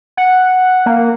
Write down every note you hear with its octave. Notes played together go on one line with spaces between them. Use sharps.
F#5
A#3